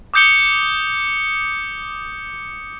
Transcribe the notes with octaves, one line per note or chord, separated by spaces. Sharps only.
D6 D#6 G6 C#7 G7